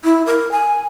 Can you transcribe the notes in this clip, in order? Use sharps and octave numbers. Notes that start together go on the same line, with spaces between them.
E4
A#4
G#5